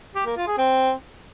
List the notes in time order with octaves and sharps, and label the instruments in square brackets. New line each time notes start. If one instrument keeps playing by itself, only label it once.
[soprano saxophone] G4
A#3
F4
G#4
C4